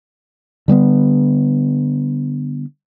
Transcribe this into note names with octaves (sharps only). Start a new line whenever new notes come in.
D3 G3 A#3 B3